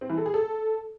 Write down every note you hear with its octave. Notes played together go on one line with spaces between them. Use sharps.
C4
E3
A4
G#4
A4